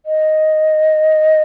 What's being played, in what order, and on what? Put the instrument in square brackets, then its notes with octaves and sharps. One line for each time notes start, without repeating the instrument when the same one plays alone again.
[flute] D#5